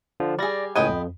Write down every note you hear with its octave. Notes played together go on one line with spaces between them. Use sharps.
D3 F3
G3 G#4 D5 A#6
C#2 A2 B3 D#5 G5 G#5
F2